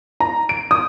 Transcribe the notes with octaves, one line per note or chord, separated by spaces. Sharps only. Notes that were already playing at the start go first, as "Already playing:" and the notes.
A#5
D7
D#6